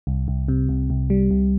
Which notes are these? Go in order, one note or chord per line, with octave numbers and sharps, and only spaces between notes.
C2
C2
C3
C2
C2
G3
C2